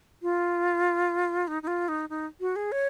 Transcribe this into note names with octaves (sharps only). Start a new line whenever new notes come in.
F4
D#4
D#4
F4
D#4
D#4
F#4
G#4
C#5